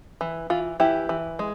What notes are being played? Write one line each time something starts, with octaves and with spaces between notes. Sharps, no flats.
E3
E3 F4
E3 E4 G4
E3
G#3